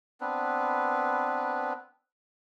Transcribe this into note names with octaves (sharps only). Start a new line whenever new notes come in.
B3 C4 D4 B4